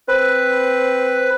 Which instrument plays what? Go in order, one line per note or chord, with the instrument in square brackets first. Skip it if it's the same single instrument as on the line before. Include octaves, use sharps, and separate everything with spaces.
[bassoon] C4 [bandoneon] B4